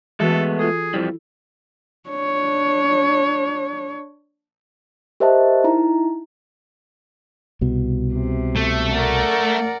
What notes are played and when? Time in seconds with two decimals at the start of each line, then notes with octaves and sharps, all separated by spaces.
0.20 E3 G#3 A3 B3 F#4 A4
0.59 F4 G#4 A4
0.94 F2 F3 G3 E4
2.09 D4 C#5
5.20 G4 A#4 C5 D#5 E5 A5
5.64 D#4 E4 A#5
7.61 C2 B2
8.13 C3
8.56 A3
8.91 A#4 D5 F#5